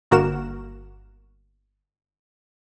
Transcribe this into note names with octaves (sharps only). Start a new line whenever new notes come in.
G1 A#3 F#4 A#4 E7